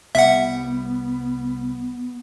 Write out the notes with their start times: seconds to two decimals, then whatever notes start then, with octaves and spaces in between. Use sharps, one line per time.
0.15 C2 G3 B3 E5 F#5